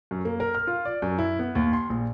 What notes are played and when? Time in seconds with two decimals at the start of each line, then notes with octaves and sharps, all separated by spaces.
0.11 F#2
0.25 A#3
0.40 A#4
0.55 F6
0.67 F4
0.85 D5
1.02 F#2
1.19 E4
1.39 B3
1.55 D#2
1.73 C6
1.90 A#1